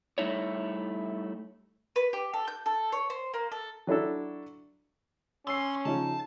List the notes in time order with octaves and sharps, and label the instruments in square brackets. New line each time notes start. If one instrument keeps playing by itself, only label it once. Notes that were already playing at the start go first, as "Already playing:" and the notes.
[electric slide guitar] G3 A3 D#4 E4 C#5
[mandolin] B4
G4
A4
G6
A4
C#5
C5
A#3
A4
[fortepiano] F#3 D4 E4 A4
[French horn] C#4 [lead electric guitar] D4 C6 [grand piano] E6 C7
[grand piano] C#3 F3 D#4 [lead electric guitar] A5